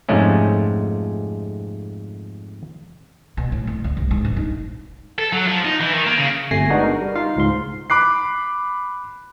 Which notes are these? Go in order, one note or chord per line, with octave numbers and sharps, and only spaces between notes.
F2 G#2 C3 G#3 A3 C#4
B2
A2
F2
D2
C2
G#2
A#1
D#4
A4
F#3
F3
D#4
E3
D#3
A#3
C#3
G1 C3 A3 G#5 A#6 C7
G#3 B3 D4 D#4 F#4
A#4
G3
D#4 F4 F5
C#2 G#2 C6
B5 D6 F#6 C7